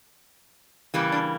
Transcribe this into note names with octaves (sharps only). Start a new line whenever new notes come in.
C#3 E3 G3 A#3
D4